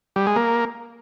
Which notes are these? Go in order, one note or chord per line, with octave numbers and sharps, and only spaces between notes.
G3
G#3
A#3